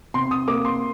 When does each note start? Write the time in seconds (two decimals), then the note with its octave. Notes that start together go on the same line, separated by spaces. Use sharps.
0.14 C3 C6
0.31 D#6
0.48 A#3 D6
0.65 C6